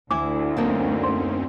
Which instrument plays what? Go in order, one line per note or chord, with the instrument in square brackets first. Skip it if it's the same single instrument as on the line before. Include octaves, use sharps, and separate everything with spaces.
[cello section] D2 [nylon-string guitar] E4 G#5 [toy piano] D6
[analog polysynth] F#2 C4 C#4 [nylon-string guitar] A#3 D#4 A5
[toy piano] C6